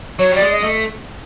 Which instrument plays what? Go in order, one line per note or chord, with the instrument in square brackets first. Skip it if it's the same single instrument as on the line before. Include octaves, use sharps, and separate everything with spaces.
[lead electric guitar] F#3 [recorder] C#5
[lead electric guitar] G3 [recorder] D5
[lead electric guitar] G#3
[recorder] D#5
[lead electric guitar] A3